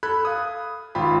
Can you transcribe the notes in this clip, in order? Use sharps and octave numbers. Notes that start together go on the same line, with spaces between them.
A4 B5 F#6 G#6
F5 D#6
G#1 F4 G5 B5